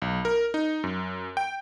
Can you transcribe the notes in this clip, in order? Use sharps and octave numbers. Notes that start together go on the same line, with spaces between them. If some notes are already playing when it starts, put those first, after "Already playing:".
B1
A#4
D#4
F#2
G5